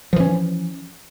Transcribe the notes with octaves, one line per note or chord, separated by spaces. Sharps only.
E3 F3 C#4